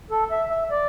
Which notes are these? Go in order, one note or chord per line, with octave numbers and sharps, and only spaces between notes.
A4
E5
E5
D5